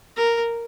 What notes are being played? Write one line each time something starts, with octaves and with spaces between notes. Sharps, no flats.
A#4